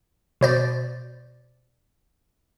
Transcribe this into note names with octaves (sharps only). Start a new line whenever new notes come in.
B2 C5 D5